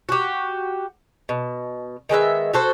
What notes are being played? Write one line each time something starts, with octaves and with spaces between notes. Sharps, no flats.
F#4 G4
B2
D#3 G#3 B3 E5
F#4 A4 C5